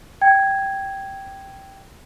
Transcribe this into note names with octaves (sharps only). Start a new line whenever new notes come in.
G5 G#6